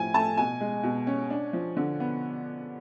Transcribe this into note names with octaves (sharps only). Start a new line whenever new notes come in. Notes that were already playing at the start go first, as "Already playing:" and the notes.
Already playing: A2 F3 G#5
A3 A5
B2 G#5
G#3
B2
C#4
D4
F3
D3
B3